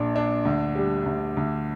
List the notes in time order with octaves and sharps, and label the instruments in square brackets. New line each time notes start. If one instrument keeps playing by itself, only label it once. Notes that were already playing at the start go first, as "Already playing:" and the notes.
Already playing: [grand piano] A#1 A#2 D4
D4
D2
G3
D2
D2